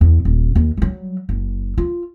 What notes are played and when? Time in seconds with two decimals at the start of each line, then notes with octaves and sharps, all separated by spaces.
0.01 E2
0.25 D#1
0.55 D#2
0.77 F#3 G3
1.29 F#1
1.78 F4